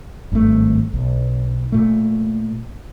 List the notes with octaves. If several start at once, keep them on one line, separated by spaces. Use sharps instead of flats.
G#1 G2 D#3 A3
B1
A#2 A3